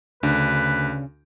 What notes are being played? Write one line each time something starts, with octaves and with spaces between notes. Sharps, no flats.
D2 C#3 D4 B4